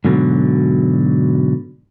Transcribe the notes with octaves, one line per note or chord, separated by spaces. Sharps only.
G#2 B2 D3 F#3